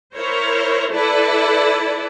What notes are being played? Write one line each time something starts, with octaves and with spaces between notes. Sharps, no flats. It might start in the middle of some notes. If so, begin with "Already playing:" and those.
E4 A#4 C5 C#5
E4 A4 B4 D5